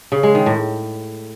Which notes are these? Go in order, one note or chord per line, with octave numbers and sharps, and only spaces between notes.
C#3
G#3
D#3
A2